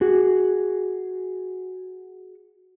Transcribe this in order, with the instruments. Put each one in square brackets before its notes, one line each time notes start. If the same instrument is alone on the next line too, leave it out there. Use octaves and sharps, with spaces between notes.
[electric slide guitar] F#4 G#4